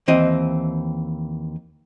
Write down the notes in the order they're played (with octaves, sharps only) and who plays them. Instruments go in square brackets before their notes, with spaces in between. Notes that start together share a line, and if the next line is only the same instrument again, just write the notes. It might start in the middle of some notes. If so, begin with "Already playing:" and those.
[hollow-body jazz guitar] D#2 E3 C4 D#5